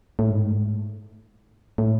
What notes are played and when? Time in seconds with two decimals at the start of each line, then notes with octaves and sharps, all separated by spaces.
0.19 A2
0.30 G#2
1.78 A2